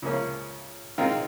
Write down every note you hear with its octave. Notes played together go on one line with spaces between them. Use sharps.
C#2 C#3 F3 A#3 C#4
D#3 G#3 C4 F4